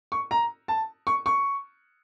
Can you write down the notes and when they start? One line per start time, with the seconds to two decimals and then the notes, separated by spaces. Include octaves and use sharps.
0.12 C#6
0.31 A#5
0.68 A5
1.07 C#6
1.26 C#6